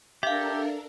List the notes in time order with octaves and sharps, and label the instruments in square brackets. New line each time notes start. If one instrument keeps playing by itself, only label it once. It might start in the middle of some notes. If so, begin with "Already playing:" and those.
[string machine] D4 A4 A#4 [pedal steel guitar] G4 [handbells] E5 F5